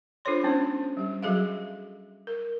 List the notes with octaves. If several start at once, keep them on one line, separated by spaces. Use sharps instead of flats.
D4 F4 A4 C5 C#5 C6
G#3 B3 C#4 D#4 C5
G3 G4
F#3 F#4 G#4 A4 E5 F5
A#4